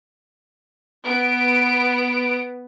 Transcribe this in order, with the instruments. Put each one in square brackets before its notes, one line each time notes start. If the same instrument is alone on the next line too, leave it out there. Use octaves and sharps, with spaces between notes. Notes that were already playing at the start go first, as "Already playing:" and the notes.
[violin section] B3 D7